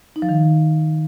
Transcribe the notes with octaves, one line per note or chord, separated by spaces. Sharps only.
D#4
F3
D#3